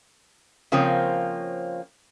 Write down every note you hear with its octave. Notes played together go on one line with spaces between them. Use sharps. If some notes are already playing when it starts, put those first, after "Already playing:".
C#3 F3 A#3 C4 C#5